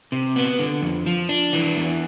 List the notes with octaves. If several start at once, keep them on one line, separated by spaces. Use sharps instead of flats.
C3
B3
D3
F2
F3
D4
E3
E2